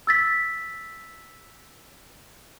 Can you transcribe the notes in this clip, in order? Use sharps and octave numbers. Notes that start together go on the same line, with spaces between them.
E6 A6 B6